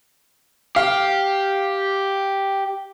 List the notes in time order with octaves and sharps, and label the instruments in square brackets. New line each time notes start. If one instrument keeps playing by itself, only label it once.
[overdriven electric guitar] G4 [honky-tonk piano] F5